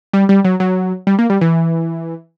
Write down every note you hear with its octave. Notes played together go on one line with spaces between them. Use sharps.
G3
G3
F#3
F#3
G3
A#3
G3
E3